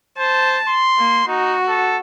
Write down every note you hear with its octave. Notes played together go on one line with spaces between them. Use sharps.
C5 A5
C6
A#3
D#4 F#4
A4